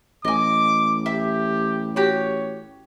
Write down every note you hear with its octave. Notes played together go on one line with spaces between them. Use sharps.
A1 D#5 G#5 D6
G4 E5
F#4 G4 C#5